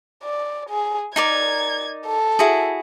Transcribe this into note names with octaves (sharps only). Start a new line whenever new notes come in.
D5
G#4
D#4 A#4 D5 G#6
A4
E4 F#4 G#4